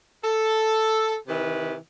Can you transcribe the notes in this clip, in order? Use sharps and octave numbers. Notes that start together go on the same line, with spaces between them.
A4
C3 D#3 E3 B4